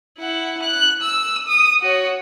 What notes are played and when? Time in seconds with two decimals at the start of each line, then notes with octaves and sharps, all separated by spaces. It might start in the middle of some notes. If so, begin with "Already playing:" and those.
0.18 E4 F#5
0.63 F#6
1.02 E6
1.48 D#6
1.82 F#4 C#5